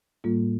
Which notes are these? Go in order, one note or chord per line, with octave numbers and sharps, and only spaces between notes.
A2 G3 A#3 F4